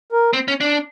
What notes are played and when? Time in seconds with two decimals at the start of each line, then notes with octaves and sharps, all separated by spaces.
0.12 A#4
0.33 C4
0.48 C#4
0.61 D4